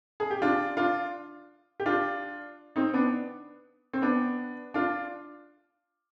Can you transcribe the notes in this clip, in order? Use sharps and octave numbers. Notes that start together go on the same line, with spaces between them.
G#4
G4
D4 F4
D4 F4
G4
D4 F4
C4 D#4
B3 D4
C4
B3 D4
D4 F4